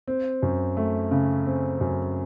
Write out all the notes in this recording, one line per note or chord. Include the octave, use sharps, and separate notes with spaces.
C4
F#2
A3
C#3
C4
F#2